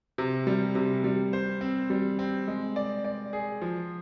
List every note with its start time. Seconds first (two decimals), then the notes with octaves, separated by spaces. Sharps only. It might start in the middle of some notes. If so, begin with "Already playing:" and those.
0.18 C3
0.47 G3
0.75 C3
1.04 G3
1.33 C5
1.61 C4
1.90 G3
2.19 C4
2.48 G#3
2.76 D5
3.05 D5
3.33 G#4
3.62 F3